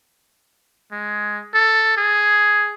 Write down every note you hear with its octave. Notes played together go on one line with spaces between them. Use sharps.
G#3
A4
G#4